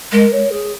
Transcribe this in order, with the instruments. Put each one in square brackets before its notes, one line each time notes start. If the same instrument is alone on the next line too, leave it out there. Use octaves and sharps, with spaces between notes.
[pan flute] G#3 [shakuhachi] A#4
[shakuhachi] C#5
G#4